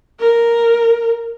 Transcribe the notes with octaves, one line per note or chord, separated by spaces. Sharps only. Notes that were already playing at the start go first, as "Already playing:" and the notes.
A#4